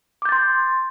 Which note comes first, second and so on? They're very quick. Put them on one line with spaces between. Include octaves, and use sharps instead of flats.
D6 G6 A6 C6